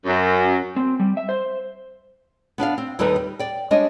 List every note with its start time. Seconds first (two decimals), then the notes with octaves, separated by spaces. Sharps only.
0.05 F#2
0.76 C4
1.00 G3
1.17 E5
1.29 C5
2.58 B3 D4 D5 F5
2.78 C4
2.99 D#2 G3 D#4 A4 B4
3.16 G3
3.39 D5 G5
3.71 G3 G#3 D4 C#5 D#5